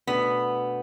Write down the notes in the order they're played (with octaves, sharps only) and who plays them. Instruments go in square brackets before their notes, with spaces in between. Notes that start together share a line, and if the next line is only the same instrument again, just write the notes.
[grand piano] B2 A3 D4 B4 [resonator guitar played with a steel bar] B3